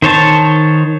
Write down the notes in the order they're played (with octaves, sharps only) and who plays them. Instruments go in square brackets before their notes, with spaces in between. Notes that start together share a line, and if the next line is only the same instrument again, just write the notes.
[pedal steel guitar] D#3 C5 C#5 A5